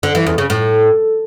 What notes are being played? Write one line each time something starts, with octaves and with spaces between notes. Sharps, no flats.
D3
E3
E2
C#3
A2